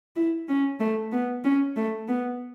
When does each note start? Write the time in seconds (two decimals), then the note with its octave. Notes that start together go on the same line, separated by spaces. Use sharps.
0.16 E4
0.48 C#4
0.80 A3
1.12 B3
1.44 C#4
1.77 A3
2.08 B3